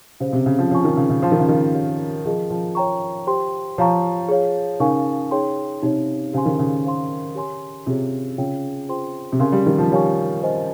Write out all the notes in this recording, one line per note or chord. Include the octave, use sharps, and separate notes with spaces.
C#3 G4 C5 F5
C3
C#3
F3
F3 C#5 G#5 C#6
D#3
C#3
C#3
F3 C5 F5 C6
D#3
C#3
D#3
G4 C#5 F5
F3 F4 G#4 D#5
F3
C#5 G5 A#5 C#6
G4 C5 G5 C6
F3 G4 C#5 F5 A#5 C#6
G#4 C#5 F5
C#3 D#4 A#4 F5 G#5 C#6
D#4 G#4 C#5 G5 C6
C3 D#4 G4 C#5
C#3 G4 C5 F5 G#5 C6
D#3
C#3
C5 F5 C6
G4 C#5 G#5 C6
C3 F4 G#4 C#5
C#3 F4 G#4 C#5 G5
F4 G#4 C5 G5 C6
C3
C#3 A#4 F5 G#5 C6
G3
D#3
F3
G3 A#4 C#5 F5 G#5 C#6
G4 C5 D#5 G#5